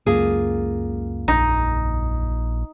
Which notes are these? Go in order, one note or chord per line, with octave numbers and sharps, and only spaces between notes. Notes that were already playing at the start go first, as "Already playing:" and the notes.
C#2 F#2 A#3 F4 G#4
A#1 D#4